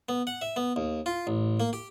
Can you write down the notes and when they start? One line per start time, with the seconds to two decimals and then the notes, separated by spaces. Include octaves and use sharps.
0.09 B3
0.27 F#5
0.42 E5
0.56 B3
0.76 D#2
1.06 F4
1.27 A1
1.60 A#3
1.73 G4